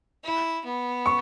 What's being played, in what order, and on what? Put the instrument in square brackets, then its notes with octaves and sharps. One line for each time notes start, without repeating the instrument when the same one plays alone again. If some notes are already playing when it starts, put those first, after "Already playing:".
[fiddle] E4
B3
[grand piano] C#6